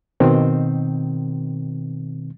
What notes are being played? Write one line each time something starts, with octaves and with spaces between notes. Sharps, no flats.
B2 D#3 C4